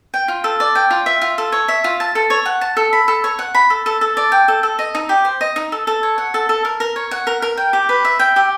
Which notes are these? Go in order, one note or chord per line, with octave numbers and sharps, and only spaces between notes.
G5
F4
A4
D5
G5
F4
E5
F4
A4
C#5
E5
F4
A5
A4
C#5
F#5
A5
A4
B5
A4
C#5
F#5
B5
A4
A4
A4
D5
G5
A4
A4
D#5
D#4
G4
C5
D#5
D#4
A4
A4
C#5
F#5
A4
A4
A#4
A#4
C#5
F#5
A#4
A#4
G5
G4
B4
E5
G5
G4